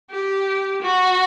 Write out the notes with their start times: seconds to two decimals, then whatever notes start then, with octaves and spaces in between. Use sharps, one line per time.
0.11 G4
0.82 F#4